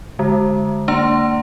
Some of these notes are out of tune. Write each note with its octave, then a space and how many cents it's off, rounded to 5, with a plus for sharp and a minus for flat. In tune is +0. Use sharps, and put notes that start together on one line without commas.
D3 +0 G#3 +0
A#3 -30 D4 +0 A#5 +0